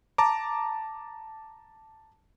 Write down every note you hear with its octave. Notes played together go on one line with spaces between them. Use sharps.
A5 A#5 D6